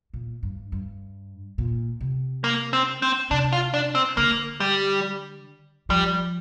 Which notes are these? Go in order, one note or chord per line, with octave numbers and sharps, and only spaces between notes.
A#2
G2
G2
A#2
C3
A#3
C4
C4
C3 D4
F4
D4
C4
D3 A#3
G3
F3 G3